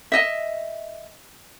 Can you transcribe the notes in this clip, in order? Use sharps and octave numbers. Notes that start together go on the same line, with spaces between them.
D#5 E5